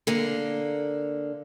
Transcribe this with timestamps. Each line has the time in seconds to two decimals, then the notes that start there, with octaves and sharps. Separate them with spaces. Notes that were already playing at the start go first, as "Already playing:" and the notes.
0.07 D3 A#3